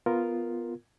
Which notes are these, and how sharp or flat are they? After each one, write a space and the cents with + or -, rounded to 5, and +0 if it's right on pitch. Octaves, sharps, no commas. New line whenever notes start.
B3 +0 F4 +0 A#4 +0